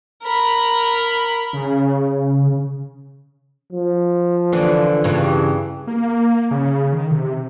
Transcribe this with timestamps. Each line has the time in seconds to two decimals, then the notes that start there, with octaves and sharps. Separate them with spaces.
0.23 A#4 B5
1.53 C#3
3.73 F3
4.53 D3 E3
5.04 G2 C#3 E3
5.87 A#3
6.51 C#3
6.93 D#3
7.11 C3